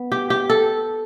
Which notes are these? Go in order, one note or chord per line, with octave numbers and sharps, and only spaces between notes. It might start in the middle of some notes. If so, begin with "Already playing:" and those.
Already playing: B3
G4
G4
A4